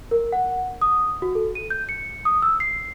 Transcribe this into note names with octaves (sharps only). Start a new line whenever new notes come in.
A#4
F#5
D#6
F#4
A4
D#7
G6
C#7
D#6
E6
C7